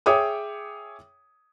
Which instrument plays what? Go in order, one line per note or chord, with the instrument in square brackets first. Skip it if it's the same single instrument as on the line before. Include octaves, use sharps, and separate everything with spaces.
[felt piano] G#4 C#5 E5 G5 D6 D#6